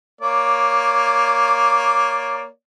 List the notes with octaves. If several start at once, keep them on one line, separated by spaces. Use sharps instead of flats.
A#3 C#5 D5